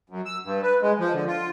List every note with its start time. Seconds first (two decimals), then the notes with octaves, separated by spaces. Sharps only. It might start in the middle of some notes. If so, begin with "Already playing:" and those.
0.10 F#2
0.26 E6
0.45 G2
0.62 B4
0.81 G#3
0.99 F3
1.13 D3
1.27 F4